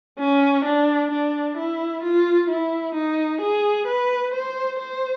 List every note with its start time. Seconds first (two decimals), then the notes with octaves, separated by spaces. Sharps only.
0.19 C#4
0.65 D4
1.11 D4
1.57 E4
2.03 F4
2.49 E4
2.95 D#4
3.42 G#4
3.87 B4
4.34 C5
4.79 C5